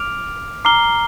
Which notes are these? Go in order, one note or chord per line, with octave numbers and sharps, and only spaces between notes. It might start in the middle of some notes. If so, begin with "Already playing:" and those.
Already playing: D6 F6 D7 F7
A#5 D6 F6 C7 G7